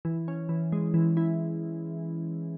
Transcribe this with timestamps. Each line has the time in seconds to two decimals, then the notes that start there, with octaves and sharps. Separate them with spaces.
0.05 E3
0.28 C#4
0.49 E3
0.72 G#3
0.94 E3
1.17 E4